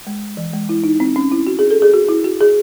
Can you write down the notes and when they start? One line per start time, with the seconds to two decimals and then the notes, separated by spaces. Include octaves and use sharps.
0.07 G#3
0.37 E3
0.54 G#3
0.69 E4
0.84 D#4
1.00 C4
1.16 C#4
1.32 E4
1.47 F#4
1.59 G#4
1.70 A4
1.82 G#4
1.94 F#4
2.09 E4
2.25 F#4
2.41 G#4